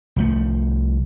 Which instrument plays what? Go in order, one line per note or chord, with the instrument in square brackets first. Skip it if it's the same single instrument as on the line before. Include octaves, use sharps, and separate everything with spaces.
[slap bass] C2 F3 A3